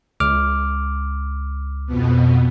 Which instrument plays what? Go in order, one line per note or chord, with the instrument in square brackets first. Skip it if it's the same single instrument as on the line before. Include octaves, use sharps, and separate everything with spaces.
[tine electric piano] C#2 D6 F6
[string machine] F2 B2 B3